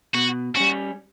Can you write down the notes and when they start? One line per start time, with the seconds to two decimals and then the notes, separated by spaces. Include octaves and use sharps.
0.15 B2 F#4
0.56 G3 C#4 F#4